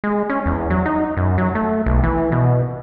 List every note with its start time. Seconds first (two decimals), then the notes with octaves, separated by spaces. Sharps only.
0.04 G#3
0.30 C#4
0.46 E2
0.70 F#3
0.86 D#4
1.17 F#2
1.38 F#3
1.55 A3
1.86 B1
2.03 E3
2.32 B2